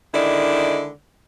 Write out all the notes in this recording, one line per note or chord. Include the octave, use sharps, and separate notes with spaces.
D3 D#3 G#3 E4 D5